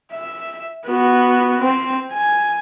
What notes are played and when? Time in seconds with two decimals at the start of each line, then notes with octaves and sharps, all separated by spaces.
0.13 E5
0.86 B3 F#4
1.61 C4
2.12 G#5